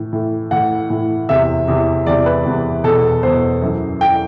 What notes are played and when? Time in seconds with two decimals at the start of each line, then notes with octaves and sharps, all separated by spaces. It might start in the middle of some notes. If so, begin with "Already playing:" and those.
Already playing: A2 E3
0.13 A2 E3
0.51 A2 E3 F#5
0.90 A2 E3
1.29 E2 C3 E3 E5
1.68 E2 C3 E3
2.06 E2 C3 E3 D5
2.26 B4
2.45 E2 C3 E3
2.84 E2 B2 A4
3.23 E2 B2 C5
3.62 F#2 E3
4.01 E3 G5